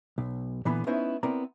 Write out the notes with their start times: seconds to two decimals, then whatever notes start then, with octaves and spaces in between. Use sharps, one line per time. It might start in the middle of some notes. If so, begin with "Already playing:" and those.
0.18 B1
0.65 A#2 D3 E3 B3 B4 B5
0.87 A3 B3 C#4 D#4 E4 C5
1.23 B3 C4 E4 A#4 D5 A#5